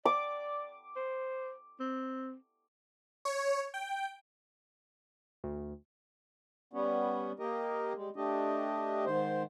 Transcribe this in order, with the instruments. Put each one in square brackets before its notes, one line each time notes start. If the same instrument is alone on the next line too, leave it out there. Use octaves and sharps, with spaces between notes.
[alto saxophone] D5 [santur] D6
[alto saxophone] C5
C4
[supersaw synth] C#5
G5
[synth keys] D2
[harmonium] G3 B3 C#4
A#3 G4 A#4 D#5
G3 G#3
A3 D4 G4 D#5
G#2 D#3 C5